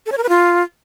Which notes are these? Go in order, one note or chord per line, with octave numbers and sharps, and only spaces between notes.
A4
C#5
A#4
B4
F4